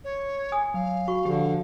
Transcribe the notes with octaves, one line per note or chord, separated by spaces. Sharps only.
C#5
G#5 D#6
F#3 F5
F#4 C#6
D3 F3 G4